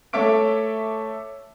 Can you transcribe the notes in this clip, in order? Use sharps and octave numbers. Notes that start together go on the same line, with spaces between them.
A3 A4 C#5 E5 D6 D7